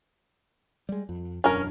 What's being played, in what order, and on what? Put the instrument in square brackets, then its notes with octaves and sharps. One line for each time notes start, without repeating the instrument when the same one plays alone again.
[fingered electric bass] G3 G#3
F2
[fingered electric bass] E1 F#2 D4 [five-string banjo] C#4 A#4